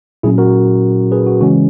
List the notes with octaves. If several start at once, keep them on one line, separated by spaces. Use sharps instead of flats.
A#2 F#3 C#4 E4 G#4
F#4 A#4
G#4 B4
F#4
C#3 E3 G#3 C#4 F#4